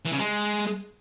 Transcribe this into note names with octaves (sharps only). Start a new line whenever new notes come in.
E3
C#3
G#3